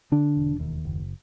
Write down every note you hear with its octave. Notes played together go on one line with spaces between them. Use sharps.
D3 D4
E1
D#2
F#1